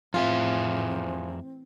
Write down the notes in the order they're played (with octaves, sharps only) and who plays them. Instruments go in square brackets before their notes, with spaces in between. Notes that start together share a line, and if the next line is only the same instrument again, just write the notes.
[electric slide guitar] F2 G#4 E5 [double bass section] A2 E3 [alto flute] C4 [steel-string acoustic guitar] F4